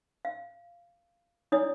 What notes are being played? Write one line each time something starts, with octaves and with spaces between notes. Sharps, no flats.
F5
D4 E4 C#5 D5 D#6